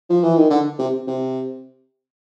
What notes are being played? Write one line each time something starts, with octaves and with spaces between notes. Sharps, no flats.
F3
E3
D#3
D3
C3
C3